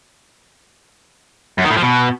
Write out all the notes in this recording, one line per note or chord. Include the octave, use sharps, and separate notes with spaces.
F#2
D#3
A2
F3
B2